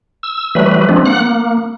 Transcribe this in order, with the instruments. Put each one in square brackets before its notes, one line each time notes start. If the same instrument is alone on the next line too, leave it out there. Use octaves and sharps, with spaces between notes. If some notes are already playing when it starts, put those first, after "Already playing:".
[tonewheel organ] E6
E3 F#3 G3 A3 B4
F3 G#3 C4 D4
A#3 F#5 F#6
A#3